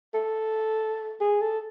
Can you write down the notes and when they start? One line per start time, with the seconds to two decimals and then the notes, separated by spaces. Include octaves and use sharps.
0.14 A4
1.21 G#4
1.41 A4